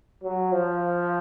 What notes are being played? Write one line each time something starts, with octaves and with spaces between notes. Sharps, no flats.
F#3
F3